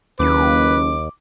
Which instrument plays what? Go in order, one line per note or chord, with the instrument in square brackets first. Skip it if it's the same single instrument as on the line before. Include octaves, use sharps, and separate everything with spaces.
[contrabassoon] F#1 [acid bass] D#2 [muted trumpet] B4 [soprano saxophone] D6